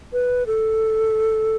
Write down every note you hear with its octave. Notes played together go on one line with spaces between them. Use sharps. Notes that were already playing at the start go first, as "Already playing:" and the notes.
B4
A4